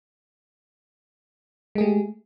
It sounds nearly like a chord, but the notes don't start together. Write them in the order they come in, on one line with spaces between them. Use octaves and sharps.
G#3 G#4 A3 G4